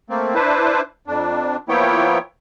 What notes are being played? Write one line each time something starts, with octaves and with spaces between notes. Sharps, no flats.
A3 A#3 C4
D4 E4 B4 C5
F2 D4
F3 A#3 B3 E4 C#5 G5